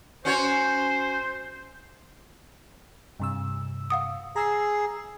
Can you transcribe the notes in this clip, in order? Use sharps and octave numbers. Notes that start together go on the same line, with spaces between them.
C#4 F#4 C5 C#5
G2 C3 E6
F5 F#5 D#6
G#4 A#5 E6 C7